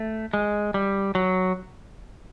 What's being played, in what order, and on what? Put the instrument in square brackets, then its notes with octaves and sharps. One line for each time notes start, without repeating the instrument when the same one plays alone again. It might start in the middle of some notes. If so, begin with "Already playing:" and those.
Already playing: [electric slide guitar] A3
G#3
G3
F#3